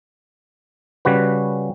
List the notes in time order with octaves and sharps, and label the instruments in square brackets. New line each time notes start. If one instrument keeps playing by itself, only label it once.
[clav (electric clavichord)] C#3 G3 F#4 B4